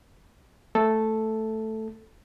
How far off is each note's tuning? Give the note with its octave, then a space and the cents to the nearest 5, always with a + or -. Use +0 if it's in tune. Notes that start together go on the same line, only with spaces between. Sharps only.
A3 +0 A4 +0